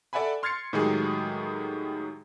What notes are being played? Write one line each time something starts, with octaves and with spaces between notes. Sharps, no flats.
A4 D5 E5 F#5 G#5 B5
C6 F6 G#6 A6 C7 C#7
A2 D#3 F#3 G#3 G4 G#4